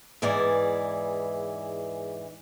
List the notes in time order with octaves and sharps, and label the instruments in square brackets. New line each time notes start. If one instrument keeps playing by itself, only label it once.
[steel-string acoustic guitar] E2 G#2 E3 G#4 D5